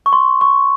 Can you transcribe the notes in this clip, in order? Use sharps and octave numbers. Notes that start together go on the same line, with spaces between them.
C#6
C6
C#6